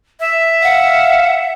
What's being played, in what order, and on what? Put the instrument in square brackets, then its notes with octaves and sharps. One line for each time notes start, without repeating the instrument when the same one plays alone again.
[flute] E5
[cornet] F5 [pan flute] F#5